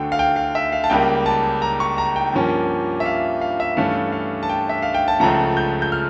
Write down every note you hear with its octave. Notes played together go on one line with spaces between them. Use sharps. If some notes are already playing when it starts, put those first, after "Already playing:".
Already playing: D2 D3 A3 G5
F5
G5
F5
E5
F5
A5
C#2 C#3 G3 A#3 G5
A5
A#5
C#6
A#5
G5
G2 F3 A#3 C#4
E5
F5
F5
E5
G2 E3 A3 C#4 F5
F5
A5
G5
E5
F5
G5
A5
C#2 C#3 F3 A3 A#5
G6
G6
F6